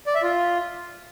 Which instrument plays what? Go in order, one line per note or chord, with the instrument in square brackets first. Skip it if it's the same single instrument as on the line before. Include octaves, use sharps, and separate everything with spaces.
[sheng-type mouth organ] D5
E5
F4